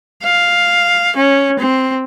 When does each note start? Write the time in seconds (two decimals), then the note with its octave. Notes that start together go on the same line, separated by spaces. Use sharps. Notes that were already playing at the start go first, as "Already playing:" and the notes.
0.23 F5
1.16 C#4
1.59 C4